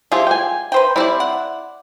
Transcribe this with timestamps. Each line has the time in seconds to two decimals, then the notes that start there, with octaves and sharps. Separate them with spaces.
0.12 F3 F4 G4 G#4 E5
0.27 G5 G#5
0.72 B4 C5 G5
0.96 G3 C4 E4 C5 D5
1.20 F#5